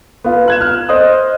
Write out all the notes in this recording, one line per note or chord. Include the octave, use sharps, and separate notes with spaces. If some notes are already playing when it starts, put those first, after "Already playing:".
B3 F4
F#6 G#6 E7
F6
C5 D#5 D#6 F#6